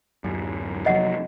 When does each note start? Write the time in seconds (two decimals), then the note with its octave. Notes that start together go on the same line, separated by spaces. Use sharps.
0.24 D1 F#2
0.86 F1 F2 F#3 D#5 F#5